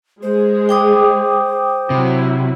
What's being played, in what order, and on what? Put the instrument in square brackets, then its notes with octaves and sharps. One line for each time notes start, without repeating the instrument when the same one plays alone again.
[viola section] G#3 G#4 [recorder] C5
[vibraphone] G5 D6 D#6
[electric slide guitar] C3 [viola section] F#3 E4